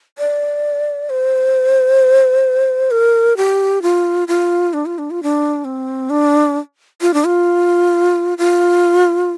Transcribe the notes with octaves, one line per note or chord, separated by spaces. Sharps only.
D5
C5
A#4
G4
F4
F4
D4
F4
D4
F4
D4
C4
D4
F4
D4
F4
F4